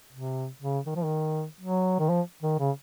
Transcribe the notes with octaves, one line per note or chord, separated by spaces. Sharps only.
C3
C#3
D#3
F3
D#3
F#3
D#3
F3
D#3
C#3